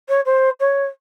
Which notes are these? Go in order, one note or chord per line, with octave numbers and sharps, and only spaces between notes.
C#5
C5
C#5